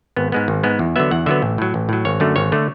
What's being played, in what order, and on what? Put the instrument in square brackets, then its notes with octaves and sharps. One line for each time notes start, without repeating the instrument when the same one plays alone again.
[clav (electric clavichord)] G#1 B3
G#2 G#3 B3
G#1
G#2 G#3 B3
E2
D3 F#3 B3 E5
E2 F#5
D3 F#3 B3 E5
A1
A2 F#3
A1
A2 F#3
G#1 C#5
F#2 D3 A3
G#1 C#5
D3 A3